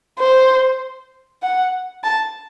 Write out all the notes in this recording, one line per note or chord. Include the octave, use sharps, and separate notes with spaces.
C5
F#5
A5